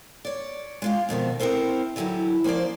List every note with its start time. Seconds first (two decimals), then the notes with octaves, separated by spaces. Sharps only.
0.25 C#5 D5
0.82 G#3 F4 G4
1.09 F2 B2 D#3 C4
1.40 C4 E4 A4 A#4 C5
1.96 D3 E3 F#3 E4 G4
2.44 F3 A#3 C#4 C5 D5